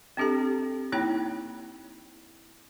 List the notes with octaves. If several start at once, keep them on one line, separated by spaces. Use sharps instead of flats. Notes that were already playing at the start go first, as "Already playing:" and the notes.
C4 D4 G4 A4 A#5
A#3 D#4 E4 C#5 G5 A#5